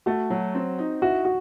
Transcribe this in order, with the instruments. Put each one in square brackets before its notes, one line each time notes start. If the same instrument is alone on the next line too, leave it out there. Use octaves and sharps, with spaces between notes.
[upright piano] A3 [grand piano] F#4
[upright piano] F#3
C4
D#4
[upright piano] E4 [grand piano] F#4
[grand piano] F#4